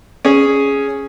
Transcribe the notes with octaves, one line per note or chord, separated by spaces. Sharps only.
C#4 G#4